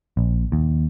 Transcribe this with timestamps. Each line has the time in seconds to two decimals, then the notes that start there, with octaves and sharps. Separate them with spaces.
0.17 A#1
0.52 D#2